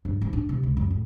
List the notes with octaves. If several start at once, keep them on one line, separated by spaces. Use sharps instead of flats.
G2
G#2
D4
C3
C#2
F#2
A2